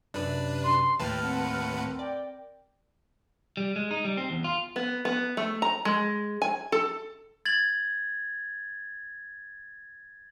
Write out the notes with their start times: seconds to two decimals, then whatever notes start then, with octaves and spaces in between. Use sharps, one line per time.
0.14 F#2 C3 D4 B4
0.63 C6
0.99 D#2 A2 B4 G5 A5 F6
1.22 C4 A#4 F#5
1.99 D5 G5
3.57 G3
3.76 G#3
3.91 D#4
4.05 G3
4.17 C4
4.30 E2
4.44 F4
4.76 B3
5.05 B3
5.37 A3
5.62 A#5
5.85 G#3
6.42 G#5
6.72 A4
7.45 G#6 A6 F#7